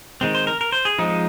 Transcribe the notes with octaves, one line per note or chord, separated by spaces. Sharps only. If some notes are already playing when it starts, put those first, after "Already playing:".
D#3 G#3 C4
C5
A#4
A#4
C5
G#4
F3 G#3 C4 D#4